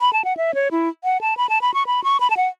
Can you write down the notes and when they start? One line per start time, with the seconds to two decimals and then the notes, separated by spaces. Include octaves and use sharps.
0.01 B5
0.13 A5
0.24 F#5
0.37 E5
0.54 C#5
0.71 E4
1.04 F#5
1.21 A5
1.37 B5
1.49 A5
1.61 B5
1.74 C#6
1.86 B5
2.04 C#6
2.20 B5
2.30 A5
2.37 F#5